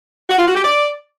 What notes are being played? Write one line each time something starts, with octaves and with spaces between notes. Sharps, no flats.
F#4
F4
F#4
G4
D5